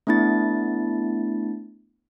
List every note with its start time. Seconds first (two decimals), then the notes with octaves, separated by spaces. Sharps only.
0.07 A3 B3 D4 E4 A6